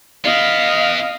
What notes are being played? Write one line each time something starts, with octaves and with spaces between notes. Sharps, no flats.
B3 E4 D#5 F5